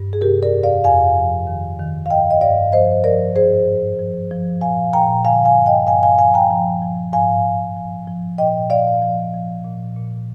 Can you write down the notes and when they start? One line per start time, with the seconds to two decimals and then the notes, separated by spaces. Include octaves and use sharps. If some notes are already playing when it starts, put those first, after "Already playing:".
Already playing: G2
0.13 G#4
0.21 C3 G4 A#4
0.43 A#4 D5
0.53 F2
0.63 D5 F5
0.84 F2 F5 G#5
1.16 F3
1.47 D#3
1.79 D#3
2.06 F5
2.10 G2 D#5 G5
2.31 D#5
2.41 G2 D5 F5
2.72 F3 C5 D#5
3.04 F3 A#4 D5
3.35 G#2 G#4 C5
3.67 G#2
3.99 F3
4.31 F3
4.61 A#2 F5 G#5
4.93 A#2 G5 A#5
5.25 D3 F5 G#5
5.45 F5 G#5
5.56 G2
5.66 D#5 G5
5.87 G2 F5 G#5
6.03 F5 G#5
6.18 F3 F5 G#5
6.34 G5 A#5
6.50 F3
6.82 F3
7.13 G#2 F5 G#5
7.44 G#2
7.76 F3
8.08 F3
8.38 A#2 D#5 G5
8.70 A#2 D5 F5
9.02 F3
9.34 F3
9.65 A#2
9.97 A#2